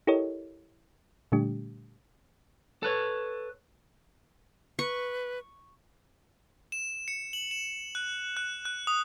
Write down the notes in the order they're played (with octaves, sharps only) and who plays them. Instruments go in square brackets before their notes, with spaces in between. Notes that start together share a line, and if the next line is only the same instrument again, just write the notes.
[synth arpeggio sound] E4 G4 A4 A#4 C#5 D#5
A#2 D3 G3 A3 D4 G4
[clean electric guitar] A4 B4 C#5
[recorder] B4 [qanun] C#6
[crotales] E7
C#7
F#7
E7
F#6
F#6
F#6
D#6